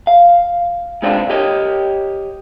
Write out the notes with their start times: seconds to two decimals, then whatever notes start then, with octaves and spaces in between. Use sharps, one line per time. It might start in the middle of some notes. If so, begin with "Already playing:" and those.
0.07 F5
1.02 G#2 C3 C4 D4 F4
1.30 G4 C#5 D#5